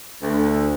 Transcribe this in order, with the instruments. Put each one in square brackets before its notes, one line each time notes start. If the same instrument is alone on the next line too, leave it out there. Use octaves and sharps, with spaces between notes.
[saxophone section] D2